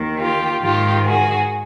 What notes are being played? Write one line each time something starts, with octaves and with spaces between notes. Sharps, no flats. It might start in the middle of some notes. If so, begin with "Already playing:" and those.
Already playing: D#2 D#3
F4 G4
G#2 D#3 F4 G4
F#4 G#4